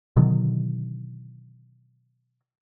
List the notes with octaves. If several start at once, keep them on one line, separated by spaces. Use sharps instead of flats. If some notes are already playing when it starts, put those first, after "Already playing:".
B2 D3 D#3 F#3